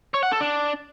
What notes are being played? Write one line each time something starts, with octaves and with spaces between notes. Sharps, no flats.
C#5
F#5
A4
D4